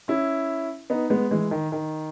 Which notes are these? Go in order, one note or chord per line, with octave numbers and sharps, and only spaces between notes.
C#4 E4
B3 D#4
G#3 B3
E3 G#3
D#3
D#3